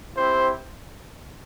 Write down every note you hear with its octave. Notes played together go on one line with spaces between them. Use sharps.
C4 E4 G4 C5